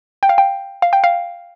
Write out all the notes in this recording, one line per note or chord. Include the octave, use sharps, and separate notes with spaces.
G5
F5
G5
F5
G5
F5